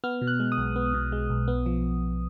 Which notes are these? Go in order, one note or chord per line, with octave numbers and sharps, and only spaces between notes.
B3 F6
B2
F#6
G#3
D#6
B1
B3
B2
G#3
B1
B3
F3